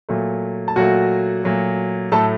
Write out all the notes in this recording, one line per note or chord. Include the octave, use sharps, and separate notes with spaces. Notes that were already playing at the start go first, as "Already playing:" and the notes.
A#2 F#3 A3
A5
A#2 F#3 A3 F#4 F#5
A#2 F#3 A3
A2 F#3 A3 A4 A5